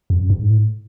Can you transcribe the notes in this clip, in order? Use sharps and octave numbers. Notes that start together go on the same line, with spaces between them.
F2
F#2
G2
G#2
A2